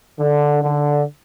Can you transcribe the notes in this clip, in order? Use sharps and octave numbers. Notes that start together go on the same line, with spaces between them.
D3
D3